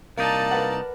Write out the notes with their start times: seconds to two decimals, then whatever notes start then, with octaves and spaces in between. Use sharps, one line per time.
0.18 C2 A#3 D#4 D5 A5
0.51 A#4 B4 F#5